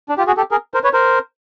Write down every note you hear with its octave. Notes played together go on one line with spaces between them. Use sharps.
D4
F4 G4
F#4 G#4
G4 A4
G#4 A#4
A#4 C5
B4 C#5
A#4 C5